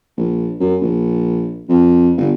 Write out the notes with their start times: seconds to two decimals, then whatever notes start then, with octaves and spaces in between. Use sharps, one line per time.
0.17 A#1
0.60 F#2
0.82 A#1
1.69 F2
2.17 G1